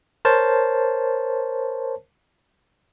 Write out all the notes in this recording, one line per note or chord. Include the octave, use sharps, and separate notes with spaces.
A#4 C5 C#5 A5